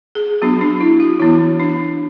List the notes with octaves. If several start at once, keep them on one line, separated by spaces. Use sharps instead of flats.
G#4
F#3 B3 D4 F#4
D4
E4
F#4
E3 B3 D4 E4
D4